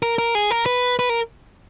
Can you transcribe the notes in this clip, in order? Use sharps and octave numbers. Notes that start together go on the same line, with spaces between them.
A#4
A#4
G#4
A#4
B4
B4
A#4